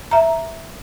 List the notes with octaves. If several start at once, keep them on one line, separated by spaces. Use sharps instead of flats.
E5 A#5